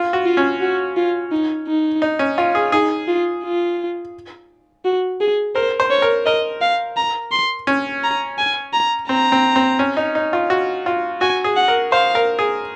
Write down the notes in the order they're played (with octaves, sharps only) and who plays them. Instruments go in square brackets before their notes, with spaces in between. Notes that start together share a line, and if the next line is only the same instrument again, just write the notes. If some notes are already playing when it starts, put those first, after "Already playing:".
Already playing: [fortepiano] F4
F#4
[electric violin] F4
[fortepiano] C#4
[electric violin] F#4
F4
D#4
D#4
[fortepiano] D#4
C#4
F4
G#4
[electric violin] D#4 [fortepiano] G#4
[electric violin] F4
F4
F#4
G#4
[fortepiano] A#4 [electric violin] C5
[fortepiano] C5
[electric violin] C#5
[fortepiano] A#4
[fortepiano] A#4 [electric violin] D#5
[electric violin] F5
A#5
C6
[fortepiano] C#4
[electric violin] A#5
G#5
A#5
[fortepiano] C4 [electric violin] A#5
[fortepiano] C4
C4
C#4
D#4
D#4
F4
F#4
F4
[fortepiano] F#4 [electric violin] G#5
[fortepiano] G#4
[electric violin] F#5
[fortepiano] A#4
[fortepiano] C5 [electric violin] F5
[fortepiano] A#4
G#4